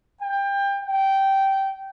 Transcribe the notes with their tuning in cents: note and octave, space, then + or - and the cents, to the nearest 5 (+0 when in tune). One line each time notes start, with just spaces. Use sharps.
G5 +25
G5 -15